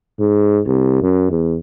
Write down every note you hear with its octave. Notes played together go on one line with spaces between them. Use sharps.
G#2
C2
F#2
E2